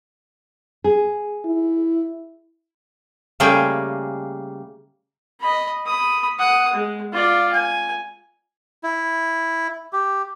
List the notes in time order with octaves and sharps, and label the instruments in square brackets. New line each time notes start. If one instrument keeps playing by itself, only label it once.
[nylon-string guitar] G#4
[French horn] E4
[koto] C#3 G3 A3 A#3 G#4 G5
[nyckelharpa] D#5 B5
B5 D#6
F#5 D#6
G#3
F4 D5
G#5
[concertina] E4
G4